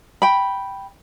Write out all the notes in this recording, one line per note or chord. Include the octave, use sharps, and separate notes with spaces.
G5 B5